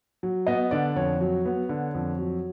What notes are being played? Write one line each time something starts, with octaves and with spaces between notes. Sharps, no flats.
F#3
B3 D#5
D3 D5
F2 C#5
F#3
B3
D3
F2
F#3